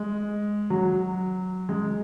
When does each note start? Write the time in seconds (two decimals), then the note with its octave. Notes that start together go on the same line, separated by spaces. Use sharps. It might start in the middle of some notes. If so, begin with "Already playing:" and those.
Already playing: G#3
0.70 F#3
1.69 G#3